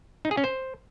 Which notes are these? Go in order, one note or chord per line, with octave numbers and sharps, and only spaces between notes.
D#4
G#4
C#4
C5